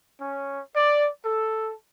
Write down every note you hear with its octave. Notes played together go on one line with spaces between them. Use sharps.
C#4
D5
A4